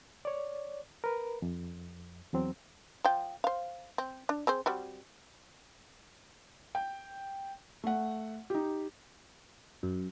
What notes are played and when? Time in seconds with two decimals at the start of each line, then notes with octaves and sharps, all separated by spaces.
0.25 C#5 D5
1.04 A#4 B4
1.42 F2
2.33 E2 F#3 C4
3.04 F3 G5
3.44 C5 F5
3.98 C4
4.29 D4
4.47 C4 G#4 C5
4.66 G3 C4 F#4
6.75 G5
7.84 A3 F#5
8.50 D#4 G4
9.83 F#2